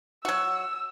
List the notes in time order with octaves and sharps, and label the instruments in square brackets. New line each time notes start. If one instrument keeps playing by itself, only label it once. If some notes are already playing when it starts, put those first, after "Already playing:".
[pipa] F#3 F#4 [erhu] E6